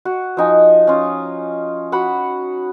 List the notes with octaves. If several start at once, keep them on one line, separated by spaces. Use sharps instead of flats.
F#4
F3 D#4 G#5
C#4 F4
F#4 F#5 B5